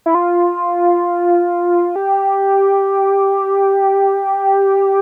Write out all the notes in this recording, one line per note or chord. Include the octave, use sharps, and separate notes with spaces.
E4
F4
G4